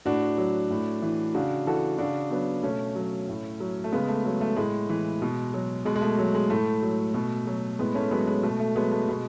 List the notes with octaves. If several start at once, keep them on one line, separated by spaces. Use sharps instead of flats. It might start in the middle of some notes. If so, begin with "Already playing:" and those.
A2 D4 F#4
F#3
A2
E3
C#3 D4 F#4
E3 F#4 A4
C#3 D4 F#4
F#3 B3 D4
B2 A3 C#4
F#3
A2
F#3
A3
C#3 G#3 B3
A3
F#3 G#3
A3
A2 G#3
E3
B2
F#3
B2 G#3
G#3
A3
F#3
G#3
A2 A3
F#3
B2
F#3
A2 G#3 B3
A3 C#4
F#3 G#3 B3
G#3
B2 A3
A3
F#3 G#3 B3
A3
B2 G#3